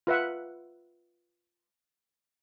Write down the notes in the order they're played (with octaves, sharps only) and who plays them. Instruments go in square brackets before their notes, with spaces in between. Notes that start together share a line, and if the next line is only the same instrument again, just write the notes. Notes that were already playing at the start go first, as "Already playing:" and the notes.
[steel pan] F4 B4 E5 F#5